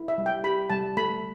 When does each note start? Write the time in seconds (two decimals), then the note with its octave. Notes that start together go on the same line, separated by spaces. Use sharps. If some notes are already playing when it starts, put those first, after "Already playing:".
Already playing: E4
0.08 E5
0.18 G3
0.26 G5
0.44 G4 B5
0.70 G3 A5
0.97 A3 B5